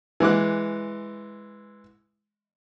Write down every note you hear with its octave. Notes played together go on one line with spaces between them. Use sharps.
E3 G#3 D6 F#6